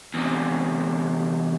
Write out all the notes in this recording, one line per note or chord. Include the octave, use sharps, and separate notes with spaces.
E2 C3